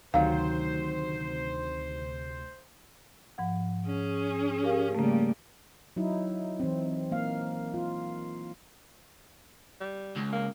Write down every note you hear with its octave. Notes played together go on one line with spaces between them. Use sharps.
D2 C3 D#3 F#3 C5 F5
G#2 F3 F#5
C#4 G#4
G4 A#4 F5
C#3 G3 A3 A#3
F#3 D#4 E4
E3 C4
A#3 F5
F4
G3
C#2
A#3